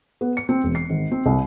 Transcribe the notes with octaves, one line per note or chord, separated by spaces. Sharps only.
B3
C#7
C4
E1
C7
G#1
C4
C2